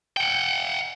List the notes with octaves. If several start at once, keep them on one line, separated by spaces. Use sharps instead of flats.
F#5 G5